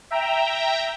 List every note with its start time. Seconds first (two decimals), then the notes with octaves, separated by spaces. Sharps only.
0.11 E5 G5 A#5